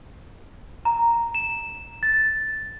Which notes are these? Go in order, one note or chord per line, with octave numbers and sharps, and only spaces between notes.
A#5
E7
A6